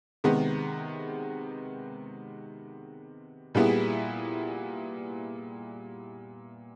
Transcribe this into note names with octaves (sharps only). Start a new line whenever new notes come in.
C3 D#3 G#3 B3
A#2 G3 B3 E4 G#4